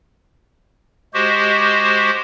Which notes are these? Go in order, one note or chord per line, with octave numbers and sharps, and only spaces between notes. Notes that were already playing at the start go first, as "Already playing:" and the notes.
G#3 F#4 G4 C5